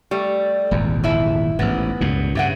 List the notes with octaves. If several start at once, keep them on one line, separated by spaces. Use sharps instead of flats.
G3 A3
D#1 G#1 E2
F3 E4 E5
A1 G#2 B3
C#2 G2 A#2
G2 C#3 G4 E5 F#5